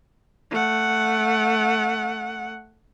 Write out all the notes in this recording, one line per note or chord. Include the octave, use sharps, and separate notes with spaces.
A3 F#5